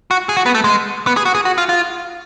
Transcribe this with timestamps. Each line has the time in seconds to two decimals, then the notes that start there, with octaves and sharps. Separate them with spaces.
0.11 F#4
0.29 G#4
0.37 F#4
0.46 B3
0.55 A3
0.64 G#3
1.07 B3
1.17 G#4
1.25 F#4
1.35 G#4
1.45 F#4
1.58 F4
1.69 F4